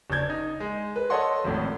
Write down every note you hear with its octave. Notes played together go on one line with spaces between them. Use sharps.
F#1 D4 D5 G6 G#6
D#4
G#3
B4
A4 C#5 D#5 F#5 C6
G#1 F2 A2